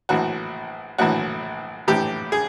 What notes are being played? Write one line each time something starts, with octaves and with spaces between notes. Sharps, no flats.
A#1 A2 E3 F#4
A#1 A2 E3 F#4
A#1 A2 E3 G4
G#4